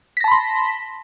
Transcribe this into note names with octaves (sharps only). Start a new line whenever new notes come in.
A5 B5 C6 A#6 B6